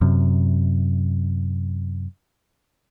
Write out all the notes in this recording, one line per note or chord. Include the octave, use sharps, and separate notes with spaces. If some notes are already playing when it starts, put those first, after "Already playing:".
F#2 C3